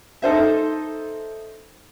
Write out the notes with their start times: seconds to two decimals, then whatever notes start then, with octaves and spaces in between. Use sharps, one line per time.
0.22 D#4 A4 C5 E5